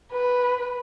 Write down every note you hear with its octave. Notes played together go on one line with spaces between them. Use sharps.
B4